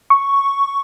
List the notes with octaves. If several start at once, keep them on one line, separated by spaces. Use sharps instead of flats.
C#6